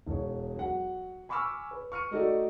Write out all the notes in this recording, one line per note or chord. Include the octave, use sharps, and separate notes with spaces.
E1 C#5
F#3 F#5
G#5 B5 C#6 D6 E6 F6
B4
C#6 F6 C#7 D#7
A3 D#4 F#4 A4 D5